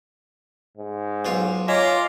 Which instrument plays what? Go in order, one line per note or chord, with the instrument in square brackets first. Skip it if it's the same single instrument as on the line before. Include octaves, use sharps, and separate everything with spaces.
[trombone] G#2
[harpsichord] B1 F4 C#5
[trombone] F4 [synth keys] C#5 D#5 G#5 [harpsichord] E5 [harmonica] A#5 C6 D6